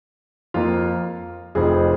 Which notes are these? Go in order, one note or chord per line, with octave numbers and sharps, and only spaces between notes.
F2 F3 A#3 F4
F1 F2 F3 C4 G#4